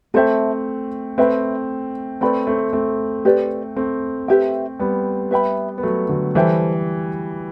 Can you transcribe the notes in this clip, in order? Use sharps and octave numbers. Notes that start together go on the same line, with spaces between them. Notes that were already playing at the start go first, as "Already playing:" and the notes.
A3 C4 A4 C5 E5 G5
A3 C4 B4 E5 G5 B5
A3 C4 B4 D5 G5 B5
A3 C4
A3 C4
G4 B4 D5
A3 C4
G4 B4 E5 G5
G3 B3
B4 E5 G5 B5
B3
F#3 A3
D3 F#3
E3 G3 A4 C5 E5 G5